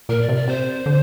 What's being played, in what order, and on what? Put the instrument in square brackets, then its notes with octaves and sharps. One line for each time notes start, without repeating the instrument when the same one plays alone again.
[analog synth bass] A#2 [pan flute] A#4
[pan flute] D5
[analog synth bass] C3
[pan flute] D5
[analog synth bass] C3 [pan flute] C5
[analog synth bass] D3